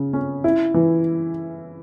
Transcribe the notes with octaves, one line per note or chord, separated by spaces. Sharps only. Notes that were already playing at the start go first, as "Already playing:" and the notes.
Already playing: C#3
C#4
E4
E3